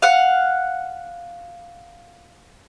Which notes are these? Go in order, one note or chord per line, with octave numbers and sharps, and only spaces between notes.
F5 F#5